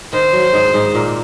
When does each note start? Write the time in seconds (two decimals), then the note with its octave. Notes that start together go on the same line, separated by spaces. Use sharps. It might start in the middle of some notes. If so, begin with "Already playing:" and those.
0.13 D#3 C5
0.33 F#3
0.53 G#2 G#3
0.74 G#2 G#3
0.95 A#2 A#3